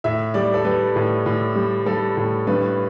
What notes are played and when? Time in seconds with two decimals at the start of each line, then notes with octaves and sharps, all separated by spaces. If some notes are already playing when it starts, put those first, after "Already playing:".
0.04 A2 E5
0.34 G3 D5
0.54 A4
0.65 G3 B4
0.96 A2
1.26 A2
1.56 G3
1.86 G3 A4
2.17 A2
2.47 G2 B4